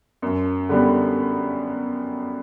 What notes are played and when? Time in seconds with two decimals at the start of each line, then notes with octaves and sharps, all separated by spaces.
0.22 F#2
0.69 D3 G3 B3